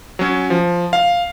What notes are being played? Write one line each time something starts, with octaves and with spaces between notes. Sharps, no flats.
F#3 C#4
F3
F5